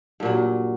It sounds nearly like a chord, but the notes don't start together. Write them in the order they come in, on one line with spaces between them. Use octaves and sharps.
G2 A#2 F#3